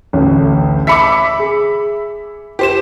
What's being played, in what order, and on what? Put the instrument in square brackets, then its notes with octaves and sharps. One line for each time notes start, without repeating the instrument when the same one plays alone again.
[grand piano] A1 D2
[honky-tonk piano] E5 B5 D6 [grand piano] B6 C#7
[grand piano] G#4
[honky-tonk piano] G4 C5 E7